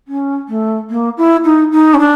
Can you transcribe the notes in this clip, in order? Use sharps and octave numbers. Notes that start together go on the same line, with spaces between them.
C#4
A3
A#3
E4
D#4
D#4
C#4
D4